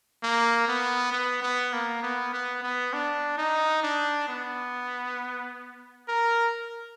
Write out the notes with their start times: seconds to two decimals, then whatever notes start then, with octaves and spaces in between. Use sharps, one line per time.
0.23 A#3
0.68 B3
1.12 B3
1.43 B3
1.73 A#3
2.03 B3
2.33 B3
2.63 B3
2.93 D4
3.38 D#4
3.83 D4
4.29 B3
6.08 A#4